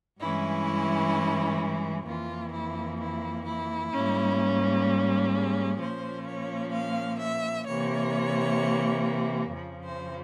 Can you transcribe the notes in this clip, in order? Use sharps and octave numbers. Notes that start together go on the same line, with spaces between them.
G2 E3 G#3 C#4 E4
F2 E3 A#3 F4
E4
E4
E4
G#2 G3 A#3 C#4
G#4
A#2 F3 A#3 C#4 C5
C#5
F5
E5
C3 E3 A#3 C#5
F2 C#3 F3
C5